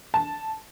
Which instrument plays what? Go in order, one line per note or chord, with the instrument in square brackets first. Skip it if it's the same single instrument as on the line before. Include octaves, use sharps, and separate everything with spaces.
[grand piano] A5